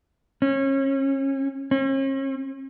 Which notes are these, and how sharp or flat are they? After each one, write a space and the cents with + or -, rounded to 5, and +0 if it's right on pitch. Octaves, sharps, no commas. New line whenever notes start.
C#4 -30
C#4 -45